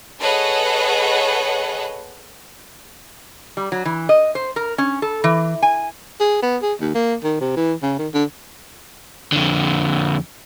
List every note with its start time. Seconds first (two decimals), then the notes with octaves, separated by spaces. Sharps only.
0.21 G#4 A4 B4 C#5 D#5 F#5
3.57 G3
3.72 F#3
3.85 E3
4.09 D#5
4.35 C5
4.56 A#4
4.78 C#4
5.02 A4
5.24 E3
5.62 G#5
6.20 G#4
6.42 B3
6.63 G#4
6.81 D#2
6.95 A#3
7.23 D#3
7.40 C3
7.57 E3
7.82 C#3
7.99 D#3
8.14 D3
9.32 F2 D3